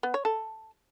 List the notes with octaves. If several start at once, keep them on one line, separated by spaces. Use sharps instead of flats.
B3
C#5
A4